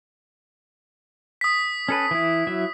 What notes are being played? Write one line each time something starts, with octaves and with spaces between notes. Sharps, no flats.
D#6 B6
C#4 A4 B4
E3 E4
F#3 E4 E5